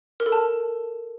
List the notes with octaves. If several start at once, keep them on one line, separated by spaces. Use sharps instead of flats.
A#4
A4
A5